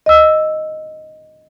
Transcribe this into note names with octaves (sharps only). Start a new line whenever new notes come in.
D#5 E6